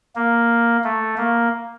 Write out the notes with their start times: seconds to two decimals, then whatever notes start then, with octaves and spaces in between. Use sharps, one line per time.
0.16 A#3
0.84 A3
1.18 A#3